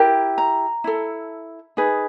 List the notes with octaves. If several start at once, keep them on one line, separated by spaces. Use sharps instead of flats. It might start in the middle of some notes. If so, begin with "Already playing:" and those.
Already playing: E4 G4 A#4
A#5
E4 A4
D#4 G#4 B4